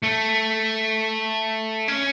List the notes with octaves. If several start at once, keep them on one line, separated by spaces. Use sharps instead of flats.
A3
C#4